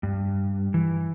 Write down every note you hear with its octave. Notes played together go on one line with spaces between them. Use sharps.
G2
E3